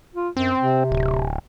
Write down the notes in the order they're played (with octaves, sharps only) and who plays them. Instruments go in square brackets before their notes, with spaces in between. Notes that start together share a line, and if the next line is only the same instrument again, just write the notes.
[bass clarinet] F4
[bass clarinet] F#2 [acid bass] C4
[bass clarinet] C3
[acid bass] D1